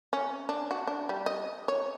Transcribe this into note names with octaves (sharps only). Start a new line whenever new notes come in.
C#4
D4
F#4
D4
G3
D#5
C#5